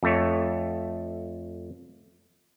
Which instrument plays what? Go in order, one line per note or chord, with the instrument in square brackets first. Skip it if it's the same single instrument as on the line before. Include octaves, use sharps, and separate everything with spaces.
[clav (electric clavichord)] F2 A3 C#5